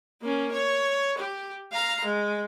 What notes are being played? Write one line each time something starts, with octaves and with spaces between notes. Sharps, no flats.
A#3 C#4
C#5
G4
F5 A#5
G#3